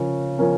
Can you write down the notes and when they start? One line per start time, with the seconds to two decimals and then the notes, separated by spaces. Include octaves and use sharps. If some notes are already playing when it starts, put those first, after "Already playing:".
Already playing: C#3 F3 C#4 A#4
0.39 F3 C#4 A#4